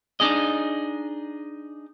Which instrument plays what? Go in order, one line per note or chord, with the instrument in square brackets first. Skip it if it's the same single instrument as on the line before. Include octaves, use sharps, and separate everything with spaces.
[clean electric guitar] D4 D#4 G#4 D#5